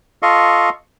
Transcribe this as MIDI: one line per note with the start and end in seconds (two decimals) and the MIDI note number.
0.23 0.69 65
0.23 0.69 69
0.23 0.69 75
0.23 0.69 77
0.23 0.69 85